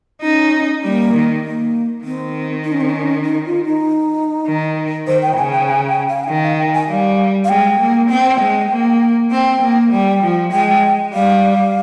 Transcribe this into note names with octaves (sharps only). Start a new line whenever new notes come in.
C#4 D#4
G3 A#3
D#3
A#3
D#3 C4
D#4
C#4
C4
C#4
D#4
F4
D#4
D#3
D#3 C5
G5
C#3 G#5
G5
G#5
G5
F5
G#5
D#3 G5
F5
G5
G#5
G3 F5
F5
G#3 G5
A#3
C4 G5
G#3
A#3
C4 G5
A#3
G3 G5
F3
G#3 G5
G3 F5